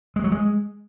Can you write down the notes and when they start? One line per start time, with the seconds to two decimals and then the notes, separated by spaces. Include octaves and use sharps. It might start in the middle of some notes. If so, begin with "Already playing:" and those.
0.16 G#3
0.24 F#3
0.32 G#3